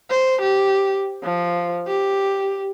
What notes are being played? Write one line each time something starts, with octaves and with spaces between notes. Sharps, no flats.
C5
G4
F3
G4